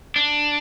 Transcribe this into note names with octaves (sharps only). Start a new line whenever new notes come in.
D4